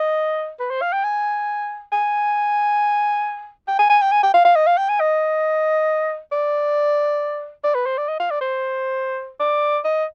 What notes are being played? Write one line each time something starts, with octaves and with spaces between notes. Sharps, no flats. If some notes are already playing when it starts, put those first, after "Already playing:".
Already playing: D#5
B4
C5
F5
G5
G#5
G#5
G5
G#5
G#5
G5
G#5
G5
F5
F5
D#5
F5
G5
G#5
D#5
D5
D5
B4
C5
D5
D#5
F5
D5
C5
D5
D#5